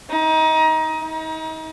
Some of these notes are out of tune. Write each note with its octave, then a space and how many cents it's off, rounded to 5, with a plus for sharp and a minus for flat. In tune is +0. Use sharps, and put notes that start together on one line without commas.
D#4 +25
D#4 +35